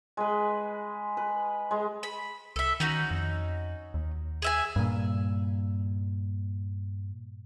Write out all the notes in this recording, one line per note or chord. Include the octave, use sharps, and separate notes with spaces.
G#3 B4
B4
G#3
B5
C2 A4 E5
D#3 C#4 D#4 F#4
F2
D#2
G#4 E5 G#5
G2 A#2